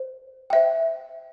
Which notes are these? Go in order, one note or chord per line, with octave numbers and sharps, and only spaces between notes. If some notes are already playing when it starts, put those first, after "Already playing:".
Already playing: C5
C5 E5 G5